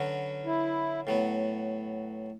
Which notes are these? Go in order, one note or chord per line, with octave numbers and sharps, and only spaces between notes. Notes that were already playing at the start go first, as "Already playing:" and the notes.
Already playing: D3 F#3 C#4 F#4 B4
E4
A2 F#3 B3